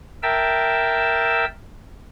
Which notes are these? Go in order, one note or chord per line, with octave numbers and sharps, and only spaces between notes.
A#4 E5 G5 A5 E6